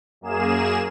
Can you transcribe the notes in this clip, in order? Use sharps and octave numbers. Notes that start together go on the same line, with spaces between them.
F#2 A#3 G#4 E7